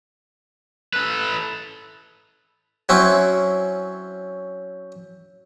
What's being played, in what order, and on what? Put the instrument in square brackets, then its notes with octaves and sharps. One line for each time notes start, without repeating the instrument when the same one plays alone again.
[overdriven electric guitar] A4 B4
[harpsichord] F#3 C4 C#4 E4